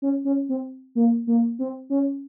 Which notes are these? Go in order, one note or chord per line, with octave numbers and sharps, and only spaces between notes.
C#4
C#4
C4
A#3
A#3
C4
C#4